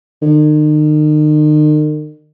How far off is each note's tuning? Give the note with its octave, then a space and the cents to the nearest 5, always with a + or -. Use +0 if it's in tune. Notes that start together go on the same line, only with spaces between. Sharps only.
D#3 -40